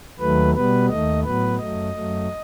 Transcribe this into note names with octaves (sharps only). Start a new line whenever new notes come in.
D#2 D#3 F#3 A3 B4
B2 G3 B3 B4
D#2 D#3 A3 D#5
A2 F#3 B3 B4
F#2 F#3 A3 D#5
F#2 F#3 A3